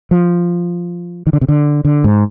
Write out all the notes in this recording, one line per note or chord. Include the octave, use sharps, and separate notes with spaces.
F3
D#3
D3
C3
D3
D3
G#2